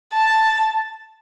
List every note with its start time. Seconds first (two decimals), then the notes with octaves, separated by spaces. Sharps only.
0.13 A5